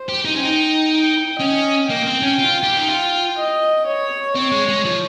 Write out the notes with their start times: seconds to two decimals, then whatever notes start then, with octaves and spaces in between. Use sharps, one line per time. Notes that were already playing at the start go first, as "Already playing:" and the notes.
Already playing: C5
0.09 G4
0.25 D#4
0.35 C#4
0.42 D#4 G5
0.91 G5
1.40 C#4 D#5
1.89 A#3 G5
2.05 C4
2.22 C#4
2.39 F4
2.63 G4
2.78 D#4
2.88 F4
3.37 D#5
3.86 C#5
4.36 C4 C#5
4.52 G#3
4.68 G#3
4.85 F3